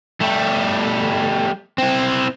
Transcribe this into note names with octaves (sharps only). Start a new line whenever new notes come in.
G3 A3
C4 E4